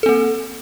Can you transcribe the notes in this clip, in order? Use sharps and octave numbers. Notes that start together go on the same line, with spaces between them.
A#3 C4 A4